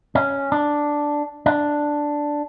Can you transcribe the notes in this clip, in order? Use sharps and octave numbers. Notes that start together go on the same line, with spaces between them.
C#4
D4
D4